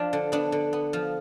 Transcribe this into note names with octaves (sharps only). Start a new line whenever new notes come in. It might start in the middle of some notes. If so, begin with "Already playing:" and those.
Already playing: F3 D4
D3
B3 D4
D3
B3
F3